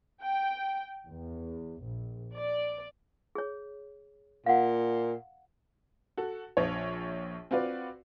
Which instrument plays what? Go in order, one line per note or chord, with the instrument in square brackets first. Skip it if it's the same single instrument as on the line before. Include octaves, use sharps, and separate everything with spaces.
[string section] G5
E2
A#1
D5
[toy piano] G#4 C#5
[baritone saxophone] A#2 [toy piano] F5 F#5
[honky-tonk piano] F#4 A4
A#1 F3 C#5
C4 F4 F#4 B4 D5